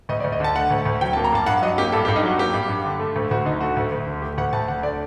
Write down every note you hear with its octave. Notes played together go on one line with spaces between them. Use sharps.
D2 D#5
D5
D2
D#5
D3 A5
A3 F#5
D2
D2
F#3 G5
A5
A#3
A#5
G2 A5
G2 F#5
F#3 D#5
A#3 G4
G2 A4
G4
G2
D#4
F#3 F#4
A#3 G4
G2
G2
D3
A3
D2
D2 F#4
D3 D#4
A3 F#4
D2
D2
D3
A3 G4
D2 F#5
D2 A5
D3 F#5
A3 D5